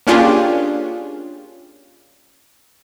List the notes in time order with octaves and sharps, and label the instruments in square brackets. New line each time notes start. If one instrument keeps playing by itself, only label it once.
[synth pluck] A#3 C#4 D4 F4 G4 G#4